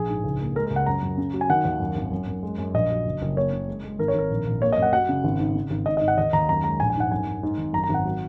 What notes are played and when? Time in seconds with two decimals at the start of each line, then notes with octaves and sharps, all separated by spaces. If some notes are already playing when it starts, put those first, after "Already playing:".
Already playing: A#1 G#4
0.09 G#2
0.24 C#2
0.40 A#3
0.56 G#3 A#4
0.67 A#4
0.71 C#2
0.76 F#5
0.86 F#2 A#5
1.02 F#2
1.18 C#3
1.33 F#3
1.41 G#5
1.50 D#3 F#5
1.65 D#2
1.80 F#2
1.95 G#1
2.12 F#2
2.27 F#2
2.43 G#3
2.58 F#2
2.74 A#1 D#5
2.90 F#3
3.05 F#1
3.22 F#1
3.36 A#3 C#5
3.52 C#3
3.68 G#3
3.84 G#3
3.99 G#1 A#4
4.08 C#5
4.14 G#1 A#4
4.30 A#1
4.46 A#1
4.61 A#3 C#5
4.72 D#5
4.76 F#2
4.82 F#5
4.93 F#3 F#5
5.09 C#3
5.24 G#1
5.40 G#2
5.55 C#3
5.70 G#1
5.86 G#2 D#5
5.97 D#5
6.01 G#2
6.08 F#5
6.18 D#2 D#5
6.33 D#2 A#5
6.48 F#2 A#5
6.64 G#3 A#5
6.80 A#1 G#5
6.90 G#5
6.96 G#2 F#5
7.11 F#2 G#5
7.27 F#2
7.43 G#2
7.58 G#1
7.73 F#2 A#5
7.84 A#5
7.89 G#1
7.94 F#5
8.05 F#3